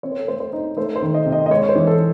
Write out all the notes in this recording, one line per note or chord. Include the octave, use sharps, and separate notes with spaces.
C4 C#5
C5
A4
A3 C5
C5
D#4
A3 C5
C5
D#3
D#5
C3
D#5
D#5
G#3 C#5
C#5
C5
E3
A4